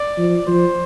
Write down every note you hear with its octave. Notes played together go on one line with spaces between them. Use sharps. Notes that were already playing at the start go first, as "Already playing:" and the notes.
Already playing: D5
F3
F3 C5